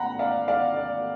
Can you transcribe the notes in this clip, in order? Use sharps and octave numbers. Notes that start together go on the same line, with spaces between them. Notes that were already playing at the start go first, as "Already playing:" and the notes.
Already playing: F#5 A#5 B5
D5 F5
D5 F5
D5